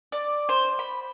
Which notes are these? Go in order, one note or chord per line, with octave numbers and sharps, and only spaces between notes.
D5
C5
B5